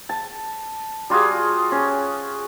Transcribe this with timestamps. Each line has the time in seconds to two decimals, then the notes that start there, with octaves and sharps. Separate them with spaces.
0.09 A5
1.10 G3 F4 F#4 G#4
1.72 C#4